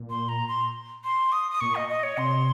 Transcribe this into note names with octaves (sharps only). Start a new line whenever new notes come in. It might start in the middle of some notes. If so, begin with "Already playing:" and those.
Already playing: A#2
C6
A#5
C6
C6
D#6
D#6
A#2 C#6
D#5
D#5
C#5
C3 C6